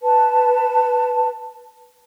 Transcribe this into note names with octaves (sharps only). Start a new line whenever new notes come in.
B4 A5